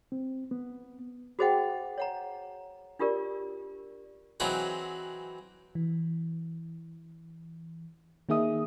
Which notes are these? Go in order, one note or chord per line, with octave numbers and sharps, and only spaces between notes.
C4
B3
F#4 G#4 C5 D#5 F#5 G5
C#5 F#5 A#5
D4 F4 G4 A#4 D5
E3 F#3 C4 D#4 G#4 B4
E3
D#3 A#3 D#4 G#4 E5 D#6